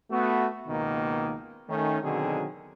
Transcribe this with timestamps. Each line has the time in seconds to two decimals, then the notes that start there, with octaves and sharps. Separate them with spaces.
0.11 A3 B3 F#4
0.69 C#2 B2 D#3 A#3
1.69 D#3 A3 C#4
2.03 B2 D3 D#3 F#3 C4 G#4